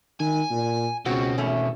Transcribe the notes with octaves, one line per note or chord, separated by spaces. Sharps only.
D#3 G#5
A#2
C#2 B2 C4 F#4
G#1 E2 A3 C#4